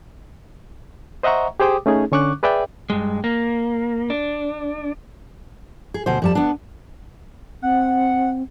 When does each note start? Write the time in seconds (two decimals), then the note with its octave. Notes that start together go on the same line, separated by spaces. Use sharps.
1.23 C5 D#5 E5 F#5 A#5 C#6
1.60 G4 G#4 C5 G5 D6 D#6
1.86 A3 C#4 D#4 G#4
2.12 D3 C#4 C#6 D6 F#6
2.43 G#4 B4 D5 E5 G5
2.90 G2 G#3
3.24 A#3
4.10 D4
5.94 G#4
6.06 D2 B2 C5
6.22 F2 G3 A5
6.35 B3 D4
7.62 C4 F#5